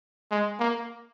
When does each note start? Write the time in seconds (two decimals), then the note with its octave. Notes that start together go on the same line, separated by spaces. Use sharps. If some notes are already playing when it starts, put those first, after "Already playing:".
0.31 G#3
0.60 A#3